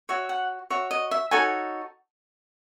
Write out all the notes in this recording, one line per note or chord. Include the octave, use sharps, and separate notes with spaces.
F#4 C#5 E5
F#5
F#4 C#5 E5
D#5
E5
D#4 F#4 A4 C#5 G#5